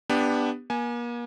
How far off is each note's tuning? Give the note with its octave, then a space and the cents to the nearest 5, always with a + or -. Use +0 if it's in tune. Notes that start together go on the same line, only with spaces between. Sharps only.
B3 +0 D4 +0 G4 +15
A#3 +40 G#5 +10